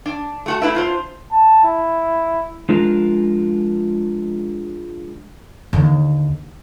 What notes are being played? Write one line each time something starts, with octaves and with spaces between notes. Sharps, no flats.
D4
A3 F#4 A5
A3 D4 E4 B4 E5
D4 F4 C5
A5
E4
F3 G#3 D4 F4 A#4
D#2 D3